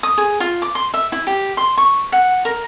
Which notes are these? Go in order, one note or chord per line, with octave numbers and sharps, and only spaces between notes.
D#6
G#4
F4
D6
C6
E5
E4
G4
C6
C#6
F#5
A#4